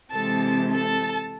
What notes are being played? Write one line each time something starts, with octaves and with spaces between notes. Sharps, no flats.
C3 E3 G#3 C4 A4 A5
A4 A5